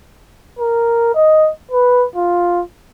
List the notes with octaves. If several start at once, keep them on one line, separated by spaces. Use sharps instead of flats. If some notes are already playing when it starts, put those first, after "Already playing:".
A#4
D#5
B4
F4